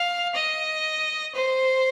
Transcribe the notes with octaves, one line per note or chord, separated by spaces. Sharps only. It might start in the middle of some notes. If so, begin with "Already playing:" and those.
Already playing: F5
D#5
C5